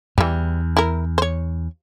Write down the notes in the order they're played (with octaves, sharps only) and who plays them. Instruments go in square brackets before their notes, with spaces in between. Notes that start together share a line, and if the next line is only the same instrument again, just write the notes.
[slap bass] E2 [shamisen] E3 G3
[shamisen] E4 A#4
C5 C#5